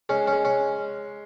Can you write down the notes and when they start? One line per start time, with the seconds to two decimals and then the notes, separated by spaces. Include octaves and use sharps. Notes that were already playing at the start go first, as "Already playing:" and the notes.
0.09 G#3 C#4
0.27 C#4
0.32 G#3
0.45 C#4